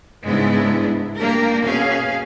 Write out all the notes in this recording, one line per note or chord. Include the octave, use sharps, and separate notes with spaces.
G#2 C#3 G#3 B3 D4 E4
A#3 D4 G4 A#4
B2 C#4 G#4 F5